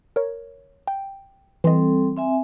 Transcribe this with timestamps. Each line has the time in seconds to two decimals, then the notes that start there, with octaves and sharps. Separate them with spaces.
0.16 A#4 C#5
0.87 G5
1.64 E3 G3 C4 A4 D#5
2.16 C4 E5 G#5